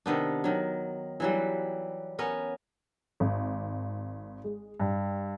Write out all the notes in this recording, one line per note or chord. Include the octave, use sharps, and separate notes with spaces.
C3 D#3 B3 D4
D#3 F#3
E3 F#3 G3
B3 C#4 A#4
G#1
G#3
G2